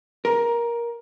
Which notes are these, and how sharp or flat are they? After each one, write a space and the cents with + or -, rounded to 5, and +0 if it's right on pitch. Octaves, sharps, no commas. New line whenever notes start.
A#4 +15